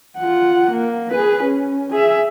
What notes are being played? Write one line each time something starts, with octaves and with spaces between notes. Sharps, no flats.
F4 F#5
A#3
G#4 B4
C#4
G#4 E5